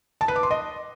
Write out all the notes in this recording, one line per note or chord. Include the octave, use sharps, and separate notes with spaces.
A5
B4
D6
C6
D#5